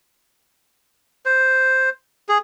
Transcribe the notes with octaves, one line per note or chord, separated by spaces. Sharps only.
C5
G#4